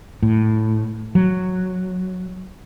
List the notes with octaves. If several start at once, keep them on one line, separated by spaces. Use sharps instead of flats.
A2
F#3